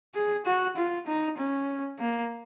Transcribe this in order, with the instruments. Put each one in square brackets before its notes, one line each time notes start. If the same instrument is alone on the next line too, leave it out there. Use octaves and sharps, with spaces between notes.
[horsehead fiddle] G#4
F#4
F4
D#4
C#4
A#3